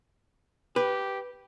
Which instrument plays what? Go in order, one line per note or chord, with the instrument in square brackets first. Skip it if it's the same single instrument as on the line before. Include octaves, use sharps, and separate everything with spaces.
[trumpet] G4 [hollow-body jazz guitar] B4